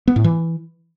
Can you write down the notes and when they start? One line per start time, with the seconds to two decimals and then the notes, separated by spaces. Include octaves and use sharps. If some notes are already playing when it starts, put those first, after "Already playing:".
0.08 B3
0.16 A2
0.24 E3